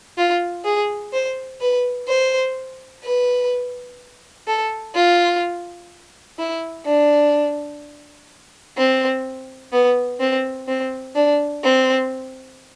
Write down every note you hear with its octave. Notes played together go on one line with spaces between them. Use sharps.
F4
G#4
C5
B4
C5
B4
A4
F4
E4
D4
C4
B3
C4
C4
D4
C4